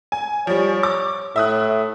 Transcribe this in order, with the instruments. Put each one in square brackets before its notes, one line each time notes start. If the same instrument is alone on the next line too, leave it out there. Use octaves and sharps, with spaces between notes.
[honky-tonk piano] G#5
[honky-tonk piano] F3 G3 [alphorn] C#5
[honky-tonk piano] D6
[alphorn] A2 [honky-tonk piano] E5 D#6 F#6